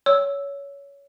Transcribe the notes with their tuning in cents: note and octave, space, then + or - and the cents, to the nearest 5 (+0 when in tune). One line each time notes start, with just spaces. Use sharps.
C#5 +15 E6 +0